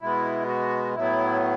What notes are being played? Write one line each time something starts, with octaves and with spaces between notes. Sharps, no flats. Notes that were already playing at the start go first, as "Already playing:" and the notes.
B2 G#3 B3 E4
F#4
A2 F#3 B3 E4